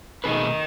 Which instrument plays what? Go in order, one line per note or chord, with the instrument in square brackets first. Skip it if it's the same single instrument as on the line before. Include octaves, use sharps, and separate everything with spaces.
[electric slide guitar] B2 A3 D#4 G#4 B4 [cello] D#3